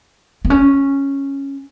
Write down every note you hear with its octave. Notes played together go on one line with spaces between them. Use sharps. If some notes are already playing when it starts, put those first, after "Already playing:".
B3
C#4